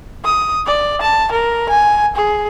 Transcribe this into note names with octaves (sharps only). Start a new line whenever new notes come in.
D#6
D5
A5
A#4
G#5
G#4